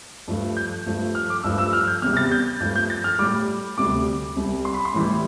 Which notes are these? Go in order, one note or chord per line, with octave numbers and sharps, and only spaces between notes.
G2 F3 A3
G6
G2 F3 A3
F6
D6
G2 F3 A3 E6
E6
F6
G6
E2 C3 G3 F6
A6
G6
G2 F3 A3 G6
G6
A6
F6
A2 G3 D6
D2 C3 G3 D6
C2 C3 G3
C6
B5
C6
A2 E3 G3